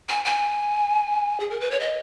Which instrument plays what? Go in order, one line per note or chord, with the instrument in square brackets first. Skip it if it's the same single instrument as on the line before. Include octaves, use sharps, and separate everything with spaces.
[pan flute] G#5
G#5
G#4
A#4
B4
C#5
D#5